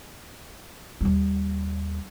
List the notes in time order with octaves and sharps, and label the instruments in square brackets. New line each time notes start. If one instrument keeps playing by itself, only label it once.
[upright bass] D#2 G3